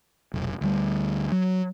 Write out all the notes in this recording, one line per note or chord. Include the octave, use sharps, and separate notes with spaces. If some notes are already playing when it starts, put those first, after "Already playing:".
F1 B1
D2 G3
F#3